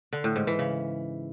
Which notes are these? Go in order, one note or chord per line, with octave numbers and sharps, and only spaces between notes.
D3
A2
G#2
E3
C#3